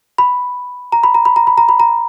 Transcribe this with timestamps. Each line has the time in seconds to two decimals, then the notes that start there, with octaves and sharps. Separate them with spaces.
0.18 B5
0.92 A#5
1.03 B5
1.14 A#5
1.25 B5
1.36 A#5
1.47 B5
1.58 A#5
1.69 B5
1.80 A#5